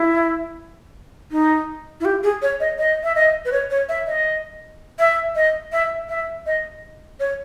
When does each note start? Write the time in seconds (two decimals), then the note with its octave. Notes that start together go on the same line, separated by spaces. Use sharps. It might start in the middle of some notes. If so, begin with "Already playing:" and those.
Already playing: E4
1.32 D#4
2.00 E4
2.05 G4
2.23 G#4
2.42 C#5
2.60 D#5
2.79 D#5
3.03 E5
3.15 D#5
3.45 B4
3.52 C#5
3.70 C#5
3.89 E5
4.07 D#5
4.99 E5
5.36 D#5
5.72 E5
6.09 E5
6.46 D#5
7.20 C#5